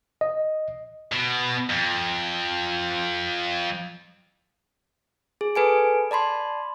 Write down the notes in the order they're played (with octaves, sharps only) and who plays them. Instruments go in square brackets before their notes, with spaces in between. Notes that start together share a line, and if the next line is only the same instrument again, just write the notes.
[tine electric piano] D#5
[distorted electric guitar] B2
F2
[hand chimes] G#4
A4 B4 G#5 D7
D5 A5 B5 C6